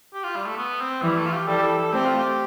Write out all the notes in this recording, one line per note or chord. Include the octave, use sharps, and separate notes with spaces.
G4
F4
G3
A3
B3
C4
E3 G3
A3
F4
G4
E3 G3 A4
G4
A4
A4
A3 C4 G4
F4
G4